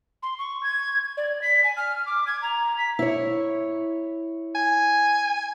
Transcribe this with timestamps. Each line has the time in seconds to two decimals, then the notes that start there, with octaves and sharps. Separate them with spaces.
0.23 C6
0.39 C#6
0.63 G#6
1.17 D5
1.42 B6
1.64 G#5
1.77 F6
2.06 D6
2.27 G#6
2.42 A#5
2.78 B6
2.99 E4 C#5
4.55 G#5